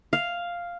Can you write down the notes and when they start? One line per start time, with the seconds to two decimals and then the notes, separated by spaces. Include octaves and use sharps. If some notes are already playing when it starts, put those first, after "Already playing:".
0.13 F5